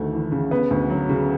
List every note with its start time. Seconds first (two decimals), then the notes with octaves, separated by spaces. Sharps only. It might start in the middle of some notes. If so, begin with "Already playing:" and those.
Already playing: D2 D#3 A3
0.12 E3
0.32 C#3
0.51 B3
0.71 D2
0.90 F#3
1.09 C#3